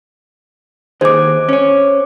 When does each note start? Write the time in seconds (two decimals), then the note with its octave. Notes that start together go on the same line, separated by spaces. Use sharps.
1.01 D#2 D#4 G#4 C5 D6
1.49 C#4 C#5